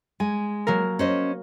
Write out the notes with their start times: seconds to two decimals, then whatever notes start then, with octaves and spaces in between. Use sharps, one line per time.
0.20 G#3 G#5
0.67 F#3 A#3 A#4
0.99 C#4 C5 D#5